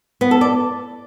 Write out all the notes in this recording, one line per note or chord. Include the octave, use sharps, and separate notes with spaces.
B3
A4
D5